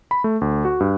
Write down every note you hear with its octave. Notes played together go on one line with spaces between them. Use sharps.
B5
A3
D2
F#4
G2